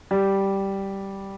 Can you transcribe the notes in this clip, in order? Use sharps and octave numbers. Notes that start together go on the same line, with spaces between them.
G3